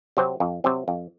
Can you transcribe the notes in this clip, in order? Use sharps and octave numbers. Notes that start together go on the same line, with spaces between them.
C3 F#3 C4
F2
C3 F#3 C4
F2